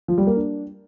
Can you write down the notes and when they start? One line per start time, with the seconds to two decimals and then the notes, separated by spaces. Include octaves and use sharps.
0.08 F3
0.18 G3
0.27 A#3
0.36 D4